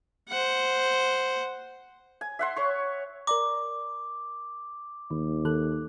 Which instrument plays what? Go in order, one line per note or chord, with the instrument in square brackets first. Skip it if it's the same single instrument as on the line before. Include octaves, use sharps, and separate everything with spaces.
[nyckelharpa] C5 F#5
[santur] G#5
E5 F#5 C6
C#5 C#6
[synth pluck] A#4 D5 A#5 [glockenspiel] D6
[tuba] D#2 [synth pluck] D#3
[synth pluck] D#3 A4 F#6